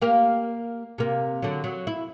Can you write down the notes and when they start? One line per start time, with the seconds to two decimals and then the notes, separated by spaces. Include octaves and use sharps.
0.02 A#3 G4 A#4
0.98 C3 A#3
1.43 D3 F#3
1.64 F#3
1.87 E4